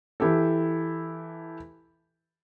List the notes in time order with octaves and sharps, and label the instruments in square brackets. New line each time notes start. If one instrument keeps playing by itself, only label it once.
[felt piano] E3 E4 G4 A4